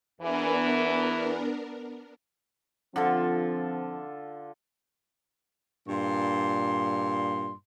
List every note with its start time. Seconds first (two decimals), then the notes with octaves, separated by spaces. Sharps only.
0.21 E2 E3 B3 D4 A#4
2.96 D3 F3 C4 F4 A4
5.88 G2 A#2 C6